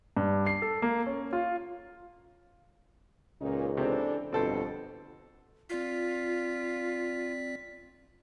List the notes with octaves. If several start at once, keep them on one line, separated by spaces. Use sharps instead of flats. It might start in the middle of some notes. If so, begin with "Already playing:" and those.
G2
C7
A4
A#3
C#4
F4
C#2 A#2 C#4 D#4
C3 E3 C4 D4 A4
G1 F2 B2 C4 A4 C5
C4 F4 D5 B6